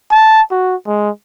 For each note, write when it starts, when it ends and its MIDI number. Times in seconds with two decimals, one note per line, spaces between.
0.11 0.42 81
0.51 0.76 66
0.87 1.10 56